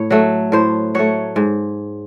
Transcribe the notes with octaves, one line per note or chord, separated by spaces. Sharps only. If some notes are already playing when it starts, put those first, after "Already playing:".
Already playing: A2 C#5
F#3 A3
A2 C5
F#3 A3 C#5
G#2